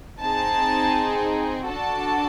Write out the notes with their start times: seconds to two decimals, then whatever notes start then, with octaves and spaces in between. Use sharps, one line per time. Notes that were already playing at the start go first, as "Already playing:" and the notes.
0.21 C4 D#4 G#4 A5
1.67 D4 F#4 A4 A5